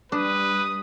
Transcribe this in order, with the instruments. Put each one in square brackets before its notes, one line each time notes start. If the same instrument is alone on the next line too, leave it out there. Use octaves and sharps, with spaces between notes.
[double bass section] G3 [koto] D4 [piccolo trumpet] B4 [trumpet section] D#6